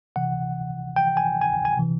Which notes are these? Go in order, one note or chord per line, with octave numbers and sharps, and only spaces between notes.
C3 E3 F#5
G5
G#5
G#5
G#5
C3 E3